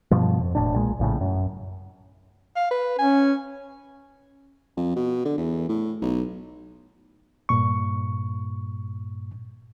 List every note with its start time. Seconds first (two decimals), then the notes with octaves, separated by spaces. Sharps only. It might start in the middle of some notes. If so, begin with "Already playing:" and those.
0.11 G2 B2 F3
0.39 F2
0.55 E1 A2 D4
0.76 B1 A#2 G#3
0.99 A#1 A2 C#3
1.21 F#2
2.56 F5
2.71 B4
2.99 C#4 G#5
4.77 F2
4.96 B2
5.25 D3
5.38 E2
5.69 A2
6.02 B1
7.49 G2 A#2 C#6